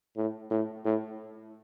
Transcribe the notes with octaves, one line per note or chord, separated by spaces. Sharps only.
A2
A2
A2